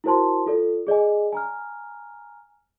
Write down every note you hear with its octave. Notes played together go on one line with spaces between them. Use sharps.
E4 F#4 A#4 C5 A5 C6
F4 A4 D5
G#4 D5 D#5 G#5
G#5 A#5 F6